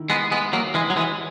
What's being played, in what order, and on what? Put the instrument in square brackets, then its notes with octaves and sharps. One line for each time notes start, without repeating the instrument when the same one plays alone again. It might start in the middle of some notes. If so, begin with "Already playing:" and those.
Already playing: [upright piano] D#3 E4
[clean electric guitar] G#3 B3
G#3 B3
F#3 A#3
E3 G#3
F#3
E3 G#3